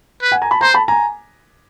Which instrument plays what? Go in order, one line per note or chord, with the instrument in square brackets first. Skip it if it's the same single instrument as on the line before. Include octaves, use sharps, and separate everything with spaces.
[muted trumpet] B4
[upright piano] F#5 G#5
G#5 A#5
A5 B5
[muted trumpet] C5 [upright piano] A#5 C6
[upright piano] A5 B5
G#5 A#5